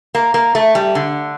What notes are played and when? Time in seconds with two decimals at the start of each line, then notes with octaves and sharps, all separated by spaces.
0.15 A#3
0.34 A#3
0.55 A3
0.75 G3
0.95 D3